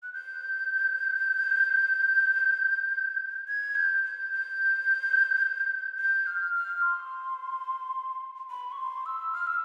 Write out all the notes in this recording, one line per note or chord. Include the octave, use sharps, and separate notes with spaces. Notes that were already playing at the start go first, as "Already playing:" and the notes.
F#6
G6
G#6
G6
G6
G6
G6
F6
F6
C6
B5
C#6
C6
E6
F6
E6